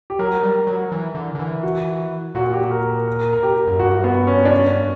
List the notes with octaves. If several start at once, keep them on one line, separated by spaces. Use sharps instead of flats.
G4
F#3 A#4
G3
F#3
E3
D3
D3
E3
F#4
A#2 F#4
G4
A#4
A#4
A#4
A#4
G4
F#2
G2 F#4
B3
C#4
D4
C#4